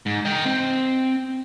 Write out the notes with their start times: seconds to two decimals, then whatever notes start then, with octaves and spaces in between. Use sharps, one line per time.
0.06 G#2
0.25 D#5 G5
0.45 C4